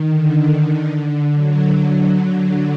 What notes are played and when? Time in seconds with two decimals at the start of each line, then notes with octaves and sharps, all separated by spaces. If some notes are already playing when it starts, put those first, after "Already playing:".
Already playing: D#3
0.09 D3
0.50 D3
0.91 D3
1.33 F#3
1.74 F#3